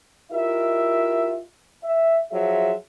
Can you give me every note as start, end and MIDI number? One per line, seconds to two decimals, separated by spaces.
0.32 1.37 64
0.32 1.37 65
0.32 1.37 67
0.32 1.37 70
0.32 1.37 75
0.32 1.37 76
1.84 2.17 76
2.31 2.73 53
2.31 2.73 54
2.31 2.73 65
2.31 2.73 68
2.31 2.73 76